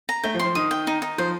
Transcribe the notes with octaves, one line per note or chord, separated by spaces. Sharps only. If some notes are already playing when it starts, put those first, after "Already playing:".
A#5
A3 G5
F3
C6
F3
D#3 D#6
G5
D#4
D#4
F3 C5